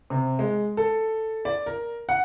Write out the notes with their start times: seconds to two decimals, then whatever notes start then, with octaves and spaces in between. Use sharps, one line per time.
0.10 C3
0.39 G#3
0.77 A4
1.45 D5
1.66 A#4
2.09 F#5